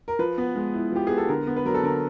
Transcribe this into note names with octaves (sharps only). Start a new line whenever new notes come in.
A#4
F3 B4
B3
G#3
E4
F3 G4
B3 G#4
A4
D3 A#4
B3
B4
F#3 A#4
A4
D3 A#4